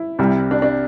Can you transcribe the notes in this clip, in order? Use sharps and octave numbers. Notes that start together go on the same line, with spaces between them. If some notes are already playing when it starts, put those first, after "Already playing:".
Already playing: E4
C2 C3 G3
D4
D4